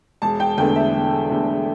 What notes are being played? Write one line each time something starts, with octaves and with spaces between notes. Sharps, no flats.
E1 A5
G5
E2 D3 A3 G5
E5
E1
E2 D3 A3